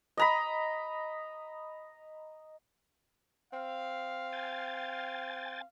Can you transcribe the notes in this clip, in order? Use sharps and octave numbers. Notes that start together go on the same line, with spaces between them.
D#5 A#5 B5
C4 F5
G5 G#5 A6